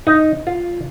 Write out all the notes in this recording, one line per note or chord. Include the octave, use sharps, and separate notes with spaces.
D#4
F4